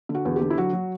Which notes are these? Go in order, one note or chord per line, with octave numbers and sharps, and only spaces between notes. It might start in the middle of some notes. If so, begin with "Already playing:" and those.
D3
F#4
E2
G4
D3
E4
F#3 F#4
F#3